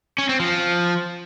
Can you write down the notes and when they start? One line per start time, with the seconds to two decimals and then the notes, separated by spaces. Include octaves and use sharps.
0.18 C#4
0.29 C4
0.40 F3